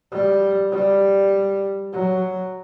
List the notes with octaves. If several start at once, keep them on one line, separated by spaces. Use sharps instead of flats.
G3
G3
F#3